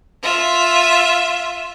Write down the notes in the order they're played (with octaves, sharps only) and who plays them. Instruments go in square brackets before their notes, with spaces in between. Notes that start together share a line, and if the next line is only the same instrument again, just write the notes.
[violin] F4 E5